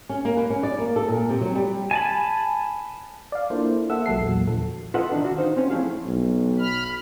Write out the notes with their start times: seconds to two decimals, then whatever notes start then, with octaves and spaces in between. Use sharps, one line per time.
0.09 C#4
0.25 A#3
0.37 B4
0.50 C#4
0.63 D5
0.78 A#3
0.96 A4
1.08 A#2
1.29 C3
1.41 F#3
1.55 G3
1.91 G#5 A5 B5
3.32 D5 F5
3.50 A#3 D4 E4 F4 A4 C5
3.90 A#3 A4 E5 F#5 E6
4.06 B1 F#3 G#3 A4 C7
4.19 E2 A#2 F#3
4.47 D3 F3 A4
4.94 F4 A4 B4 D#5 E5 F#5
5.12 D#3 D4
5.24 D#3 F#4
5.36 D#4 C5 F5
5.56 C4 C#4
5.70 F3 A3 E4 G#4 F5
6.06 B1
6.59 B5 F6